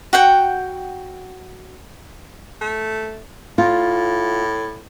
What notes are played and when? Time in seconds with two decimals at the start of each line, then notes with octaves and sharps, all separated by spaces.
0.13 F#4 F#5 G5
2.61 A3
3.58 A2 F4